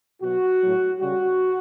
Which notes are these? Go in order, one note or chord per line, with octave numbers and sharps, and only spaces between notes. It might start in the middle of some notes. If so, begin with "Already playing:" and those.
B2 F#3 F#4
A2 F#3
C#3 G3 F#4